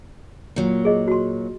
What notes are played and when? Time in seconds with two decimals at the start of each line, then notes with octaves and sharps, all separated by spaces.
0.56 A#2 F#3
0.85 G#4 D#5
1.08 F#4 C6